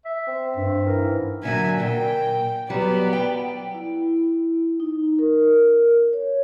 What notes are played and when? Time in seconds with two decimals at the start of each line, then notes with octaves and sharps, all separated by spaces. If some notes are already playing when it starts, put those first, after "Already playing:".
0.05 E5
0.27 C4
0.57 G2
0.86 E3 A#4
1.02 G#2
1.43 A#2 D3 F#3 E5 G#5
1.80 A#2 G5
2.70 F#3 G3 B3 D5
3.13 G5
3.74 E4
4.80 D#4
5.19 A#4
6.13 C#5